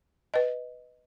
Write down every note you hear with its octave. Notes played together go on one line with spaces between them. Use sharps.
B4 D#5